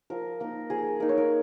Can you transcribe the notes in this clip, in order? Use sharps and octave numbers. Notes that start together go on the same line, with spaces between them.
F3 A#4
A#3 D#4 A#4
F3 G#4
A#3 D#4 A#4
C#5
A#4